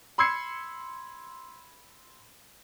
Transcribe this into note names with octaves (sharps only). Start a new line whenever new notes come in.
B5 C6 E6 G#6 C7 C#7